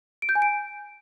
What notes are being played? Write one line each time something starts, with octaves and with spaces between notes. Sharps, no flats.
D7
G6
G#5
D7